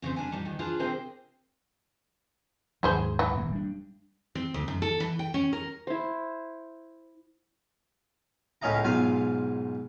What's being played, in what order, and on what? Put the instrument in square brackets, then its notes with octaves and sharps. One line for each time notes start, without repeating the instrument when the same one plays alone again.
[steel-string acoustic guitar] A#2 C#3 C4 C5
G3 D4 A#4 G#5
A#2 E3 G3 D#4
D2 D#3
D4 F4 G#4 B4 C5
C3 C4 D4 G#4 A#4 C5
[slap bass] D#2 G#2 F#3 [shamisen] E4 G#4 C5
[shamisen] E3
[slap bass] D#1 F2 A#3
G3 D4
[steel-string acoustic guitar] C4
D2
F#2
A4
E3
G5
C#4
A#4
[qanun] E4 C5
[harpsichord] C#2 A2 C#4 D#5 F5 A#5
B1 G#2 F4 F5 G#5